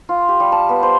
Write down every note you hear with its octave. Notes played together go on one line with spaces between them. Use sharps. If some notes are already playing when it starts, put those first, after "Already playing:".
F4
G4
G3
A5
B3
C5